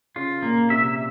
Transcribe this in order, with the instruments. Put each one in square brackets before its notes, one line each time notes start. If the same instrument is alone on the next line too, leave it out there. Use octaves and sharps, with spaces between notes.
[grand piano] C#3 [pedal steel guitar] F4
[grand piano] A#2 [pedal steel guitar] A#3
[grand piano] C3 [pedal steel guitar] E5